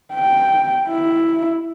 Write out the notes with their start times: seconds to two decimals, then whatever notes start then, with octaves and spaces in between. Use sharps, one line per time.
0.14 G5
0.89 E4